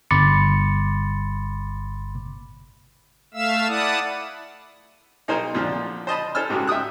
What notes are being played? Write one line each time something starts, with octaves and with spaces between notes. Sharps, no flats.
G1 B5 C6 D6 A6 C#7
A3 E5 F5 E6
E4 D5 F#5 A5 D#6
B1 D#4 G#4 A#4 C5 G#5
F2 A#2 D3 F3
C5 D#5 A5 B5
A4 C5 G#5 A5 E6 F6
C#2 G#2 C#3 F#4 G4
E5 G5 D#6 F#6